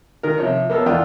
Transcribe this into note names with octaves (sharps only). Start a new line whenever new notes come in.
D#3 A#4
C3 F3 C#5
A#3 B3 A4 C#5 A5
E2 D4 F4 A4 G5 D#6